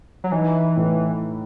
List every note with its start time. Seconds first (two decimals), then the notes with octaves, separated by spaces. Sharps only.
0.24 F#3
0.32 E3 D#4
0.76 A2